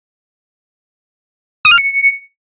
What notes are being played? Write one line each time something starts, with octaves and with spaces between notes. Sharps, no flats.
D#6
F6
C#7